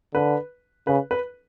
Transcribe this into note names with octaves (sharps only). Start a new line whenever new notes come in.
D3 B4
C#3 B4
B4